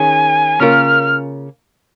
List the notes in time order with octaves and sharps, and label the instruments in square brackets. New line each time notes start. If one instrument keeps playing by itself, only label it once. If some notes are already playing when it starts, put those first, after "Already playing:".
Already playing: [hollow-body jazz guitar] D#3 C#4 G#4 [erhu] G#5
[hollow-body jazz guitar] C#3 A#3 C#4 F4 A#4 [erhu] F6